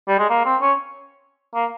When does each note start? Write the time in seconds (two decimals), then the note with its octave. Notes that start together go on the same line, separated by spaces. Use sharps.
0.08 G3
0.19 G#3
0.30 A#3
0.45 C4
0.62 C#4
1.55 A#3